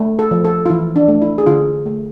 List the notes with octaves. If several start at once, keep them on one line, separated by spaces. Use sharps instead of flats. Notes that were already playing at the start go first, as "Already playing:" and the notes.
Already playing: A3
A4
F3
A4
F4
E3 E4
D4
A3
E4
G#4
D3 F4
A3